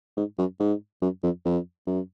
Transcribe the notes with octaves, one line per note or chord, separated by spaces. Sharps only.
G#2
F#2
G#2
F#2
F2
F2
F#2